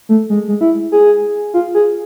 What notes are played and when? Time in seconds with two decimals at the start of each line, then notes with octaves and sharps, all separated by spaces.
0.09 A3
0.30 G#3
0.48 G#3
0.61 E4
0.92 G#4
1.54 F4
1.75 G#4